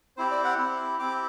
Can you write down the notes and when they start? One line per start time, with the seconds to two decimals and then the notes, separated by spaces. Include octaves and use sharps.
0.17 C4 E4 G4 C5
0.31 D5
0.44 F#5
0.58 C4 E4 G4
0.99 C4 E4 G4 D6